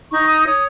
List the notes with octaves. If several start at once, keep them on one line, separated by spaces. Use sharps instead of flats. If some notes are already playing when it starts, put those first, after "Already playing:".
D#4 C#6
D#6
C#5 D#6